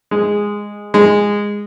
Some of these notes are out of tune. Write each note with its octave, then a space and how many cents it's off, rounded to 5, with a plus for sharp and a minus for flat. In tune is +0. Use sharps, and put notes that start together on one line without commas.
G#3 -10
G#3 -15